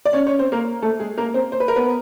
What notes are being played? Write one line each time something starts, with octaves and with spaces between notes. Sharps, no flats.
D5
C#4 C#5
C#4 C#5
C4 C5
A#3 A#4
A3 A4
G#3 G#4
A#3 A#4
C4 C5
C5
B4
A#4
B3 B4